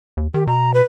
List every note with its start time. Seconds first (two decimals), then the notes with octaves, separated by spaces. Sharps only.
0.17 D#2
0.34 D#3 G4
0.47 B2 A#5
0.74 B4